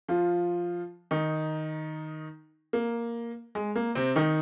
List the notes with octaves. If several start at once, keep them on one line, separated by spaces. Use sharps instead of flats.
F3 F4
D#3 D#4
A#3
G#3
A#3
C3 C4
D#3 D#4